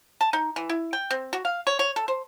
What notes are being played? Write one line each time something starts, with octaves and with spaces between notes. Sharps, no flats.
A5
D#4
E3
E4
G5
C4
F#4
F5
C#5
C#5
A4
C5